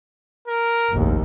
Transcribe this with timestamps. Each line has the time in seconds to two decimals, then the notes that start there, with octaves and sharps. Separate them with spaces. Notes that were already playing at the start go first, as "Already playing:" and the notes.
0.48 A#4
0.91 F1 A#1 D#2